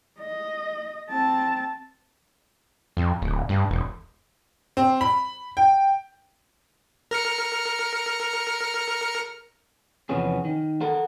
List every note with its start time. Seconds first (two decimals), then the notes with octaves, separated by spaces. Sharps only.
0.19 D#5
1.10 C4 A5
2.97 F2
3.22 D1
3.49 G2
3.70 E1
4.77 C4
5.01 B5
5.57 G5
7.11 A#4 F6 C#7
10.09 E2 C3 F3 B3 C#4 G#4
10.45 D#3
10.81 A4 A#4 F#5